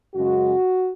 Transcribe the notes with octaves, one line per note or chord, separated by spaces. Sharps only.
F#2 C#3 G#3 F#4